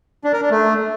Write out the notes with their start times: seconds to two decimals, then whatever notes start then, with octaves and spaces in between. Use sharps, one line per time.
0.24 D4
0.33 A#4
0.42 D4
0.50 A3